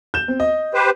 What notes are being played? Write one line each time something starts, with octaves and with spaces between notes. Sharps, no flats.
G6 E7
C4
D#5
G4 B4 C5